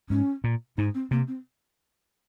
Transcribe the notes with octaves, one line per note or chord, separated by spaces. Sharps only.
G#2 C#4
A#2
G#2 D#4
C4
C3 A#3
C4